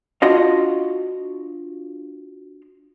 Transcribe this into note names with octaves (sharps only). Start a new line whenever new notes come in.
D4 F4 F#4 D#5 F5